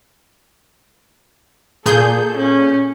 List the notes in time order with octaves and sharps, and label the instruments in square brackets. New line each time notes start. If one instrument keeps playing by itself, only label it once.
[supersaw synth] A#2 G#4 G6 [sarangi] A4
[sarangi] C#4